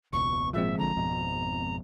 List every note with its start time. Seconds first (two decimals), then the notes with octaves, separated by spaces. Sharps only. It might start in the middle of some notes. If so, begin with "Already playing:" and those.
0.12 E1 C#2 B2 C#6
0.53 G#1 A#2 F3 G#3 C4 E5
0.78 A#1 D3 A#5
0.96 G#1 F2 B2